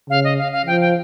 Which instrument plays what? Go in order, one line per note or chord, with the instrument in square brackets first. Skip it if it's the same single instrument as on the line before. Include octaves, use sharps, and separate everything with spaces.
[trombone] C#3 [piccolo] F5
[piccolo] D#5
F5
F5
[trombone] F3 [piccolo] G5
[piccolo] G5